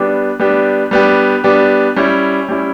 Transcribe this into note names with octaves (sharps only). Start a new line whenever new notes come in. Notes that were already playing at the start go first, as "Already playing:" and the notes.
Already playing: G3 B3 D4 G4
G3 B3 D4 G4
G3 B3 D4 G4
G3 B3 D4 G4
G3 C#4 E4
G3 C#4 E4